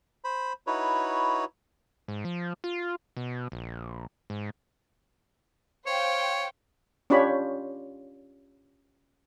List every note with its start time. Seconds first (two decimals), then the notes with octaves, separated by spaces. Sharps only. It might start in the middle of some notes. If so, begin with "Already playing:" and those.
0.24 C5 B5
0.67 D#4 E4 F#4 B4 C#5
2.08 G#2
2.25 F3
2.64 F4
3.17 B2
3.52 A#1
4.30 G#2
5.86 C5 C#5 F5 G5
7.10 C#4 D4 F4 G4 C#5 B5